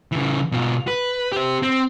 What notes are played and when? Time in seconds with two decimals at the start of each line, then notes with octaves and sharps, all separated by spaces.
0.12 C#3 E3
0.52 B2 F4
0.88 B4
1.32 G4 C5
1.62 C4